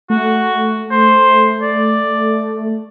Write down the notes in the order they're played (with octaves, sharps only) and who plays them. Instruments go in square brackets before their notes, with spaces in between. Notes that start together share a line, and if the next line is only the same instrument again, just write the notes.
[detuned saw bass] A3 [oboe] F#4
[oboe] C5
D5